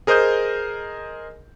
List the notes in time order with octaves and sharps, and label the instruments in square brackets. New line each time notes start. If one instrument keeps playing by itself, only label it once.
[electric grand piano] G#4 A#4 C5 D#5 D#6 G6